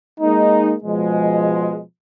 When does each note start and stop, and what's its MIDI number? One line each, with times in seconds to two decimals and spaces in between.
0.21 0.74 56
0.21 0.74 58
0.21 0.74 63
0.83 1.80 47
0.83 1.80 53
0.83 1.80 56